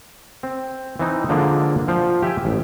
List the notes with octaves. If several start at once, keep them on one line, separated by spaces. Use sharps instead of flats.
C4
E3 C4 D#4
D3 F3 G#3 A#3 D4
F3 F5 G5
G4 E5 G5 G#5
A1